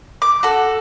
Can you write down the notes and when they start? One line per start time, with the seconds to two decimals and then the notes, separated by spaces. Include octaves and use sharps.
0.22 D6
0.43 F#4 A4